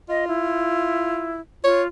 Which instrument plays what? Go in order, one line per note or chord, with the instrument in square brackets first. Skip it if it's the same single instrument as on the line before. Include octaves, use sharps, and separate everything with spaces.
[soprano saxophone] F4 [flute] D#5
[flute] E4
[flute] F4 [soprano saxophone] C#5